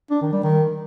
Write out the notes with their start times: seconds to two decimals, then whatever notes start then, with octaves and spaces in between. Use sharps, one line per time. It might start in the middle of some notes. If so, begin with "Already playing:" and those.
0.11 D4
0.22 D#3
0.32 G3
0.43 D#3